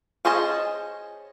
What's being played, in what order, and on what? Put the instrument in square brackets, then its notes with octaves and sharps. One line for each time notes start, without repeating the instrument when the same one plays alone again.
[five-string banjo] C#4 G#4 C5 D#5 A5